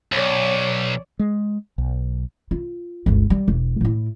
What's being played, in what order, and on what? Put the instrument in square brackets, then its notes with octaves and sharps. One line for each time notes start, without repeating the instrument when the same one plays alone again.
[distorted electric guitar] B1 [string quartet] C#5 D5
[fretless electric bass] G#3
B1
[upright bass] F4
G1 C#2
G3
E1
A2 E4